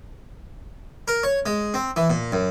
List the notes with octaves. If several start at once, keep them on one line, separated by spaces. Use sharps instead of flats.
A#4
C#5
G#3
C4
E3
A#2
F#2